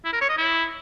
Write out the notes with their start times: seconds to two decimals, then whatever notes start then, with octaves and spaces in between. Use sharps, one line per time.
0.05 E4
0.13 A#4
0.21 C#5
0.29 D#5
0.37 E4